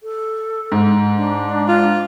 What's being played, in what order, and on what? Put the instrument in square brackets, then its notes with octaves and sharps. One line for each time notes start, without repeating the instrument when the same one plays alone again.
[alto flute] A4
[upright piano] G#2
[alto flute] D4
[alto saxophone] F4